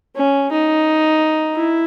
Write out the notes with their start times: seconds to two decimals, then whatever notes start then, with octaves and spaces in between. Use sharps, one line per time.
0.16 C#4
0.51 D#4
1.56 E4